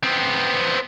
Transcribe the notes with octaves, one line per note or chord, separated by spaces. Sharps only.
B3 C4